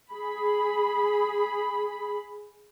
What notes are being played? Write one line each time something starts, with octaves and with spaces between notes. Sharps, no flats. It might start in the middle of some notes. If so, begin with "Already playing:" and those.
G#4 B5